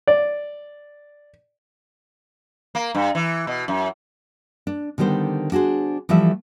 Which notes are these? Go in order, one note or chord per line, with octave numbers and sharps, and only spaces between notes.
D5
A#3
G2
E3
B2
F#2
D4
D3 D#3 G3 B3 C5
D4 F#4 G#4 C5
E3 F3 G3 A3 F4 E5